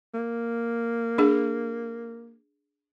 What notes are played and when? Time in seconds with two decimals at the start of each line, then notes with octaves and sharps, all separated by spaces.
0.14 A#3
1.18 D4 G#4